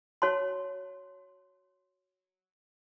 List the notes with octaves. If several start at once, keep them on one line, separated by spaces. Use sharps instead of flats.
F#4 C#5 A5 C6